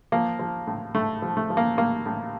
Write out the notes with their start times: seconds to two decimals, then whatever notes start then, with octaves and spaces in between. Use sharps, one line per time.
0.12 F3 A#3
0.39 F3
0.67 A2
0.95 A2 A3
1.22 F3
1.37 A3
1.50 F3
1.57 A#3
1.77 A2 A#3
2.06 A2